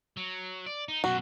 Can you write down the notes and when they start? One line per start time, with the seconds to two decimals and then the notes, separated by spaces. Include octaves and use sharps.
0.17 F#3
0.66 D5
0.88 D#4
1.04 F#2 B2 F#4